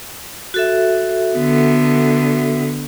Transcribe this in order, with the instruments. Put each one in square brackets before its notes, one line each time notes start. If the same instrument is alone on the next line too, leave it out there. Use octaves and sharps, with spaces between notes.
[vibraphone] F#4 A4 E5
[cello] D3 B3